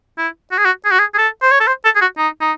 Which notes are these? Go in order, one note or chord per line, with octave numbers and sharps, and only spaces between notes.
E4
F#4
G#4
F#4
G#4
F#4
G#4
G#4
A4
C5
C#5
A4
C5
A4
G#4
F#4
D#4
D#4